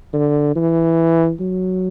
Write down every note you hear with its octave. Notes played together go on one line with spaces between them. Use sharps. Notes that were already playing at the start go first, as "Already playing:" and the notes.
D3
E3
F#3